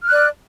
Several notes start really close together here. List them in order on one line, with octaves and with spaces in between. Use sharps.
F6 F#6 D5